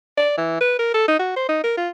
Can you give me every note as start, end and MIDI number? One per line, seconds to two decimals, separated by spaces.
0.17 0.34 74
0.38 0.58 52
0.61 0.78 71
0.79 0.92 70
0.94 1.08 69
1.08 1.19 63
1.19 1.33 66
1.36 1.47 72
1.49 1.60 63
1.64 1.73 70
1.77 1.89 65